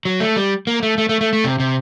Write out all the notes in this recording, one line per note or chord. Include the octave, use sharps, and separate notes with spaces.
F#3
A3
G3
A#3
A3
A3
A3
A3
A3
C3
C3